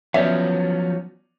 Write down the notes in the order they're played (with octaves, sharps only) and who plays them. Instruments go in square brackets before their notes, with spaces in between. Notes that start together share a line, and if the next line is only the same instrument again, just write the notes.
[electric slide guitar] F3 F#3 [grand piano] B3 C#4 D5 [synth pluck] E5